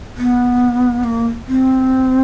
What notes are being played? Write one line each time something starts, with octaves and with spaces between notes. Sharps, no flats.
B3
A#3
C4